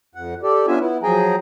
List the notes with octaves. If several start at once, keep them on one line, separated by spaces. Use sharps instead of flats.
F2 F#5
G4 A4 D5
B3 C#4 D4 F4 E5 G#5
B3 E4
F3 F#3 G#4 G5 G#5 A#5